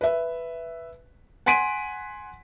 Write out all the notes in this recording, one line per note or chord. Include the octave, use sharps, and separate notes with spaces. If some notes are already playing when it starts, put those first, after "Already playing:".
B4 E5
F#5 G#5 C6 B6 D7 D#7